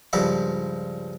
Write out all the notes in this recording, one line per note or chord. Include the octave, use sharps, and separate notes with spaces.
C#2 G2 F3 A4 A#5 B5